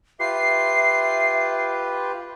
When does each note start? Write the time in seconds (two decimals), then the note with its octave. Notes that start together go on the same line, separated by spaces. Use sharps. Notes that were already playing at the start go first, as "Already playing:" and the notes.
0.20 F4 G4 B4 E5 C7